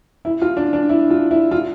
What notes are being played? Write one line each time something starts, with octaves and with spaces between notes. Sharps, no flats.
E4
F4
D4
D4
E4
F4
E4
F4